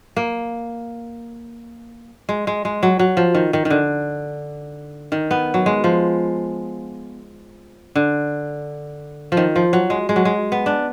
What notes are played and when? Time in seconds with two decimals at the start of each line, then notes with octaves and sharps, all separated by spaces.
0.16 A#3
2.29 G#3
2.47 G#3
2.65 G#3
2.83 F#3
2.99 F#3
3.17 F3
3.35 D#3
3.53 D#3
3.65 D#3
3.70 D3
5.12 D#3
5.31 B3
5.54 F#3
5.66 G#3
5.84 F3
7.95 D3
9.32 F3
9.37 D#3
9.56 F3
9.73 F#3
9.90 G#3
10.09 G#3
10.16 F#3
10.25 G#3
10.52 B3
10.66 D4